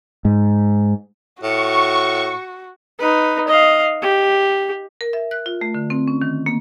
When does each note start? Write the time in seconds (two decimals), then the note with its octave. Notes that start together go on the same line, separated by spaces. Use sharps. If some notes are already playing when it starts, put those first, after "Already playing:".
0.25 G#2
1.43 A2 F#4 C#6
3.00 D#4 B4
3.48 D#5 F5
4.03 G4
5.01 A#4
5.13 E5
5.31 F#6
5.46 F4
5.61 A3
5.74 D3
5.90 C4
6.08 C#4
6.22 D#3
6.46 A#3